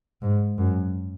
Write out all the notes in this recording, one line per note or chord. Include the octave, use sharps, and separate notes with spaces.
G#2
F#2